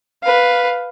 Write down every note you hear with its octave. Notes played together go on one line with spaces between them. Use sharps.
B4 F5